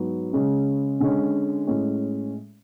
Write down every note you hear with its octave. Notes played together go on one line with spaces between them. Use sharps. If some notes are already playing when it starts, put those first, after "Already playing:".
Already playing: G#2 F#3 B3
C#3 G#3 C#4
D3 G#3 C#4
A2 G#3 C#4